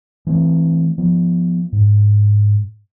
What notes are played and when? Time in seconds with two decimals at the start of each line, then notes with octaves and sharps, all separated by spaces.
0.27 E3 A3 C4
0.98 F3 B3
1.72 G#2